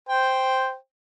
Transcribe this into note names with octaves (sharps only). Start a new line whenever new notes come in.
C5 G5